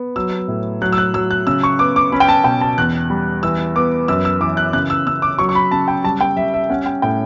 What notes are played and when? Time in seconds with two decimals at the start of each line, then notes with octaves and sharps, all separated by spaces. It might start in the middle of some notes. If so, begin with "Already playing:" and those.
Already playing: B3
0.16 F#3 E6
0.48 A2
0.81 F#3 F#6
0.93 E6
0.98 F#6
1.14 F#3 E6
1.31 F#6
1.47 C#3 E6
1.63 C#6
1.79 B3 D6
1.96 D6
2.12 C#4 B5
2.20 G5
2.28 A5
2.44 B2 G5
2.61 A5
2.78 E2 F#6
3.10 G3
3.43 E3 E6
3.75 B3 D6
4.08 F#2 E6
4.25 E6
4.41 E3 D6
4.57 F#6
4.73 C#3 F#6
4.90 E6
5.07 C#3 E6
5.22 D6
5.38 F#3 C#6
5.49 C#6
5.55 B5
5.71 C#3 A5
5.88 G5
6.04 G3 A5
6.21 G5
6.37 G3 E5
6.54 E5
6.70 C#4 F#5
6.86 G5
7.02 A2 G5